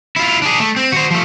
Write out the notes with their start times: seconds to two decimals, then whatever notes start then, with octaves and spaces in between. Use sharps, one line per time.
0.16 E4 F4
0.42 D4 G#4
0.59 A3
0.76 C4
0.92 F#4 C5
1.11 F3 A3